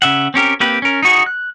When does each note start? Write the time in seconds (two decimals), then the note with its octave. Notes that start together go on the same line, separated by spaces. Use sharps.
0.02 C#3 E5 F#5
0.34 C4 C#4 G4 A#4
0.60 A#3 C4 G4 B4
0.82 C#4 A#4
1.03 D#4 F#4 G#4
1.26 F#6